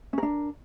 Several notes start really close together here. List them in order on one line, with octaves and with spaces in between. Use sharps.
C#4 A#4 D4